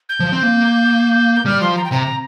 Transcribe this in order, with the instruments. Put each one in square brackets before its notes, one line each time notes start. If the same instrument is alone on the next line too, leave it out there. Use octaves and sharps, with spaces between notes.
[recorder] G6
[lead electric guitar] F3
C4
A#3
[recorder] G6
[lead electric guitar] G3 [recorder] F6
[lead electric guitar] F3 [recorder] C6
[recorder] A#5
G5
[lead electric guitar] C3 [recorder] A#5